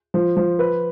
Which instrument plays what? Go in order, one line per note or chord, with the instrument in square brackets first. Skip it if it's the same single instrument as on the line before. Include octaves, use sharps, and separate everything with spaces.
[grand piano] F3
F3
B4